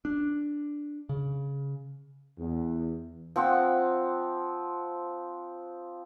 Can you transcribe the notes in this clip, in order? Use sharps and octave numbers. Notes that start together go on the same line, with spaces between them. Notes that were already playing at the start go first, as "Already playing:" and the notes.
D4
C#3
E2
F3 C4 F#5 E6